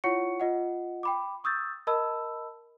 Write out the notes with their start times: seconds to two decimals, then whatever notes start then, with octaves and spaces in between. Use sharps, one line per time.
0.04 E4 F4 C#5 F#5 C#6 C#7
0.40 F4 D#5 F#5
1.03 G5 B5 D6
1.44 C#6 D#6 E6 G6 A6
1.87 A#4 D#5 A5 B5 E6